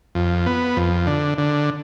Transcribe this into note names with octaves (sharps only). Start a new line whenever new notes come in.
F2
B3
F2
D3
D3